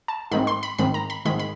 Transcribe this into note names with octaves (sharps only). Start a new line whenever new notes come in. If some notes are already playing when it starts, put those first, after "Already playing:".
A5
G#2 D#3 G#3 C4 B5
C6
B5
G#2 D#3 G#3 C4 B5
A#5
B5
G#2 D#3 G#3 C4 B5
B5